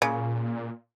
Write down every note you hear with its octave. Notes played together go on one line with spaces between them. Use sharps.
A#2 C#3